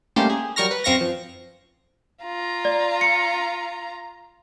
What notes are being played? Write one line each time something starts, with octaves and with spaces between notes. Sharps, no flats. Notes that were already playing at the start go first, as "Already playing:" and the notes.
G3 A3 A#3 C#4 G4 C5
G#4
F#3 G3 A#4 C#6 F6 A#6
B4
F#2 C4 F5 C#6 A#6
F3
F4 A#5
D5
C#7